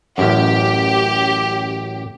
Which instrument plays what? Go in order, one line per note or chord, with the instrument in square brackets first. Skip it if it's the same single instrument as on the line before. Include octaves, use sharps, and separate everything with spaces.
[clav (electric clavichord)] A1 F#2 [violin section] G4